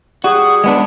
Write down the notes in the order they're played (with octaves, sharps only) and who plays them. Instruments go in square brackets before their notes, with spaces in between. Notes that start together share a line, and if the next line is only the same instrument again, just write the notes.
[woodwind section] G3 G#4 D#6 [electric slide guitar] F#4
[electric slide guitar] G#3 B3 D4